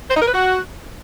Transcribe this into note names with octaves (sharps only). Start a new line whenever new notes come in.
C5
D#4
A#4
B4
F#4